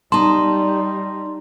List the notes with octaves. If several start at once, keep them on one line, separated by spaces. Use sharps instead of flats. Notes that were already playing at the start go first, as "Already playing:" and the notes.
G3 D#4 A5 C6